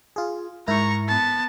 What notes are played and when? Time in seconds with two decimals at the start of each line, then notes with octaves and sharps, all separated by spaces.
0.16 F4 G#4
0.67 G#2 E4 A#4 A#5 C#6
1.08 B3 A5